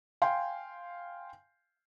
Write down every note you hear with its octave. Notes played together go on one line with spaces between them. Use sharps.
F5 G5 G#5 C6